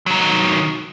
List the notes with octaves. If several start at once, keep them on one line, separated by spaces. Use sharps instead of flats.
D#3 F#3